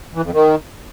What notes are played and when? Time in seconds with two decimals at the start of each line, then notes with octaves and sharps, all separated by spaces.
0.15 E3
0.24 F2
0.34 D#3